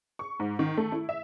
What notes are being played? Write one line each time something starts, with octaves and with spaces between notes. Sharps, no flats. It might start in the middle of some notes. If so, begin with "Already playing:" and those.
C#6
G#2
D#3
A3
E4
E5